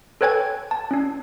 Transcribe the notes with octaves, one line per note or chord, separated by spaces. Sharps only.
A4 B4 C#5 G5 G#5 G#6
A5
C#4 D4